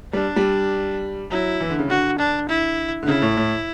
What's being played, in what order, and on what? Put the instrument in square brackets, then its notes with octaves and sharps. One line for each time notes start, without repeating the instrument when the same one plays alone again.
[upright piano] G3 [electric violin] D4
[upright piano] G3
[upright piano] F#3 [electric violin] E4
[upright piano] E3
D3
C#3
[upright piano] D3 [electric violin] F#4
[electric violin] D4
E4
[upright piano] D3
[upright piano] C#3 [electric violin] E4
[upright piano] A2
A2